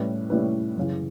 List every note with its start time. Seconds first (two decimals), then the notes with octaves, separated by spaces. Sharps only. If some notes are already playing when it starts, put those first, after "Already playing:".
Already playing: A2 G3 C#4 E4 B4
0.30 A2 G3 C#4 E4 B4
0.77 F#2 C#3 E3